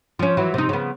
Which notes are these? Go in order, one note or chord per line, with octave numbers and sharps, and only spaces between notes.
F3 C#4
E3 F#3 E4
C3 D#4
C#3 B3